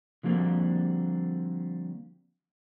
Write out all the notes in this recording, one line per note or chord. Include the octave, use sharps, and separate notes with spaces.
D3 F3 G3 A#3 C4 F#4